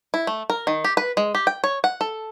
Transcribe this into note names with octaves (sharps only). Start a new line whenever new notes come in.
E4
A3
A#4
D#3
G4
B4
G#3
G4
G5
C#5
F#5
A4